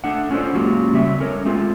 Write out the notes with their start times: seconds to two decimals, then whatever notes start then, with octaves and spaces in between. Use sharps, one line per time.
0.04 A3 D4 F#5
0.31 C#4 F4 A4 C5 D5
0.54 F#3 G#3 A#3 C#4 F4 G4
0.93 C#3 F#3 G3 C4 E5
1.20 C#4 A4 A#4 C#5
1.45 G#3 A3 C4 F4